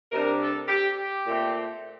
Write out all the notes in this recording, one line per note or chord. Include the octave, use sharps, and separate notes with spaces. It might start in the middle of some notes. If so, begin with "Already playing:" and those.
C3 G3 D4 A#4
A4
G4
G4
A#2 A3 C4